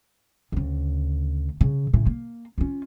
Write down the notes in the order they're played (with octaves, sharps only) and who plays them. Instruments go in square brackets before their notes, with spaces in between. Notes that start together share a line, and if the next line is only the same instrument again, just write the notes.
[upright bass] D2 C#3
C#3
A2 C#3
A#3
C#4 F4